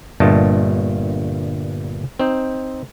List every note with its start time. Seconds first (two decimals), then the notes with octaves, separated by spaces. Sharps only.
0.20 G1 G2 A#2 A3 D#5 A5
2.20 C4 D#4 C5